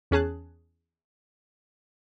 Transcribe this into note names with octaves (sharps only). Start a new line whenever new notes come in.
E2 C#4 G#4 A5 F#6